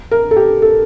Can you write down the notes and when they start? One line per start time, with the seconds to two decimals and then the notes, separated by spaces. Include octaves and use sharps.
0.11 A#4
0.31 A4
0.36 G4
0.62 A4